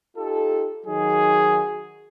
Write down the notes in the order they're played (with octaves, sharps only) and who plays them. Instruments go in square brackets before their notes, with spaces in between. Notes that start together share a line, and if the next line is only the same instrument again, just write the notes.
[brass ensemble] D#4 F4 G4 A4
D#3 F#3 D#4 F#4 G#4